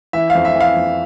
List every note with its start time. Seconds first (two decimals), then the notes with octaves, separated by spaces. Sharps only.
0.13 E3 E5
0.30 F2 F5
0.45 E5
0.55 E3
0.61 F5
0.76 F2